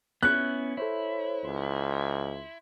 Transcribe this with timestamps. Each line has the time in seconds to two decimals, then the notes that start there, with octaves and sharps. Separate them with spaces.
0.23 B3 C#4 E4 F#6
0.77 E4 A4 C5 C#5
1.44 C#2 C6